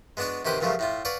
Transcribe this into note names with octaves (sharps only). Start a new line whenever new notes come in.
G#3 B3 D4 F#4 C#5
C3 D#3 F#4 G4 B4 C5
G2 A#2 C#3 F3 F#3 A3
A2 E4 F4
B4 C#5 D5 F5 F#5